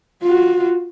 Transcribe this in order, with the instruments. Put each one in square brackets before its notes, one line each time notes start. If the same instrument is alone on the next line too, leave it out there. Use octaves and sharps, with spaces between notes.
[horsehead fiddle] F4 F#4